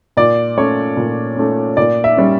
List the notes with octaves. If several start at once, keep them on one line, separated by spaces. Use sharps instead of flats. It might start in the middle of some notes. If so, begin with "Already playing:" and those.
A#2 D5
A3 C#4 C#5
A#2
A3 C#4
A#2 D5
E5
G3 C#4